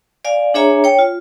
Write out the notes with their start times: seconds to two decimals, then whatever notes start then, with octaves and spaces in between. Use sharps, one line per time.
0.25 D5 F5 G#5
0.54 D4 G#4 C#5 E5 G#5 A#5
0.84 C#5 G5
0.99 F4